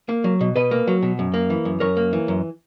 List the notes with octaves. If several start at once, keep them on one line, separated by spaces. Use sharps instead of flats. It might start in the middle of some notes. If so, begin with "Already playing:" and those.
A#3
F#3
B2
B2 B4 D#5
A#3
F#3
B2
F#2
A#3
E3
F#2
F#2 A#4 C#5
A#3
E3
F#2